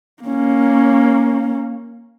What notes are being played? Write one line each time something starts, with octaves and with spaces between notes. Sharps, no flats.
A#3 C#4